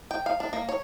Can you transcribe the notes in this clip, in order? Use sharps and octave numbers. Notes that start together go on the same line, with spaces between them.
G5
F5
D4
A#3
C#5